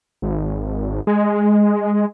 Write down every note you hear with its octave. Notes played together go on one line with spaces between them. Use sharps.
G#1
G#3